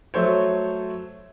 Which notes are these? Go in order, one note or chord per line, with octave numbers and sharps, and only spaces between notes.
F#3 A3 A4 C5 C#5